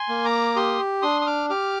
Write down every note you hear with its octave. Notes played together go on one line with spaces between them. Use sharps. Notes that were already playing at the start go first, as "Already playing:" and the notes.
Already playing: G#5 C6
A#3
A#5 D6
G4 C6 D#6
D4 C6 D#6
D#6
D6 F6
G4 D6 F6